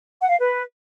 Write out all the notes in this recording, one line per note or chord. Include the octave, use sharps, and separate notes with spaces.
F#5
F5
B4